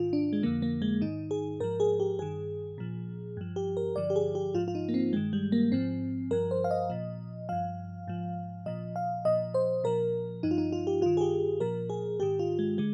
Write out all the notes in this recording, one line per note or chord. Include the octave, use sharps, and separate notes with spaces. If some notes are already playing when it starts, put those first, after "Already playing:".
Already playing: G#2 D#3 F4
D4
G#3
F2 D3 F3 A#3
A#3
G#3
G#2 D#3 D#4
G#4
G#2 F3 A#4
G#4
G4
G2 D#3 G#4
A#2 F3
G2 F3
G4
A#4
G2 D3 F3 D5
G4
G#4
G4
G#2 F3 F4
F4
D#4
A#3
C4
G2 D#3 G#3
G3
A#3
G#2 F3 C4
G2 F3 A#4
C5
F5
D#5
A#2 F3
G2 F3 F5
G#2 F3
A#2 F3 D#5
F5
A#2 F3 D#5
C5
A#2 F3 A#4
G2 F3 D#4
F4
D#4
F4
G4
G2 D#3 F4
G#4
G4
A#2 F3 A#4
G#4
G#2 D#3 G4
F4
G#3
D3 G#3